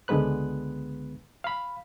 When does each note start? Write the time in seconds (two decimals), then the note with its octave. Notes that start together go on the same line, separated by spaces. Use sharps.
0.08 C#2 D3 G#3 B3 B4 F#6
1.44 F5 B5